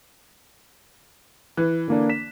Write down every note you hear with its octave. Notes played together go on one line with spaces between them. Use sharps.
E3 F#6
D3 A#3 D4
B6 E7